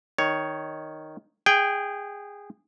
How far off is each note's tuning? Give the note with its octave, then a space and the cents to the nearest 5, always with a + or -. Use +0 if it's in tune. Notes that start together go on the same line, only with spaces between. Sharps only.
D#3 +0 C#5 +5
G#4 -20 G5 +0